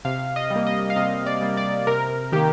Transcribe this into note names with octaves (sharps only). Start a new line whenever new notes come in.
C3 F5
D#5
G3
A#3
D#5
F5
C3 D#5
D5
G3 A#3
D5
C3 A#4
D#3 A#3 G4